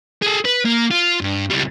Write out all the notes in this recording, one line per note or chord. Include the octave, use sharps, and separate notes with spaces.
G#4 A4
B4
A#3
F4
G2
C#2 G3